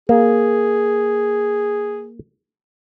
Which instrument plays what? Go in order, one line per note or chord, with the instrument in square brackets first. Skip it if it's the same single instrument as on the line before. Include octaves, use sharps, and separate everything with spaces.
[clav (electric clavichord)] A#3 [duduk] G#4